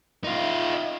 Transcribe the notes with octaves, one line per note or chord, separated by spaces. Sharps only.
D#4 F4